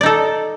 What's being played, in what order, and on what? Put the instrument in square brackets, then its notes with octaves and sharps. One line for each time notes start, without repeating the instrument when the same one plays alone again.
[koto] D5
D#4
A4